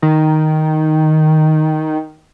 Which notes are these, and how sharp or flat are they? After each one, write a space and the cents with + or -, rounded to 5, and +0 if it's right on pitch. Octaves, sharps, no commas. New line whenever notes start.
D#3 +0